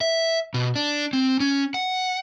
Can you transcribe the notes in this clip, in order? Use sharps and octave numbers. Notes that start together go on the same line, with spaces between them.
E5
B2
D4
C4
C#4
F#5